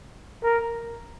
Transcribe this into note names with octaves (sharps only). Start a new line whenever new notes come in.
A#4